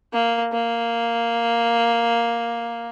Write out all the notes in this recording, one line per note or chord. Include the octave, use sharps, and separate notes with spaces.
A#3
A#3